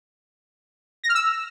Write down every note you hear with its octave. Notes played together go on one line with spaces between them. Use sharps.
A#6
F6
E6